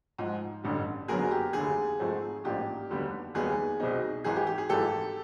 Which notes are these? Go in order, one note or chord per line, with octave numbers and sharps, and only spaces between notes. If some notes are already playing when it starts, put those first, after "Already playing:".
G#2 F3 G#3
A1 G2 D3 G3
F#1 F#2 D3 F#3 B3 G#4 A#4
G4
F1 D#2 D3 G#4
G#2 F3 A3 C4
A1 G#2 F3 A#3 D4 G4
F1 D#2 D3 G3 B3
F1 D#2 D#3 G3 B3 G#4
C2 B2 G3 C4 D#4
G#1 G#2 E3 G#4
G4
G4
G#4
G#1 G#2 E3 G4 A4